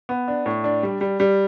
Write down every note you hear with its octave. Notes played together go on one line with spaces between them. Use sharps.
B3
D4
A2
D4
G3
G3
G3